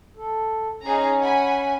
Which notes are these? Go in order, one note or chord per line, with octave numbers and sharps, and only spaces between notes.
A4
C#4 D#4 G#4 A#5
F#5 G#5 B5